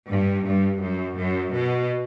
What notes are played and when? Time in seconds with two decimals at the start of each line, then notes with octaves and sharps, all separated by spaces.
0.10 G2
0.46 G2
0.82 F#2
1.18 F#2
1.54 B2